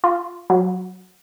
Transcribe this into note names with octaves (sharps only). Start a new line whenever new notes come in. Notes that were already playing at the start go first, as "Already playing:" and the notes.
F4
F#3